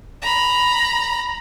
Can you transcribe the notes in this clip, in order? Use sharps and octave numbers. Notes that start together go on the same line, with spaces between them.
A#5 B5